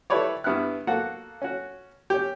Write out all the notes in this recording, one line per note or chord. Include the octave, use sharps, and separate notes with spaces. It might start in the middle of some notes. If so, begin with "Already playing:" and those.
E4 G4 A4 B4 C#5 D5
G2 B3 E4 F6 F#6
A#3 F#4 A4 F#5
C#4 F#4
C#4 G4